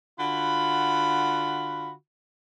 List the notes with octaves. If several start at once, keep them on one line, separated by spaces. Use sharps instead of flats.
D3 F4 F#4 B5